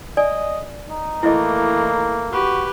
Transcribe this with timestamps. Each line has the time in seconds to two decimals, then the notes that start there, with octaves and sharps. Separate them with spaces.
0.17 D5 D#5 G#5
0.90 D#4
1.23 E3 A3 A#3 E4 D#5
2.32 F#4 G4 B4